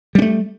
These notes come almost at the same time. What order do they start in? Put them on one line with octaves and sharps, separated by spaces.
G3 C#4 A3